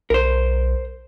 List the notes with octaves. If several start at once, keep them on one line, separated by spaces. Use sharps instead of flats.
B1 A#4 C5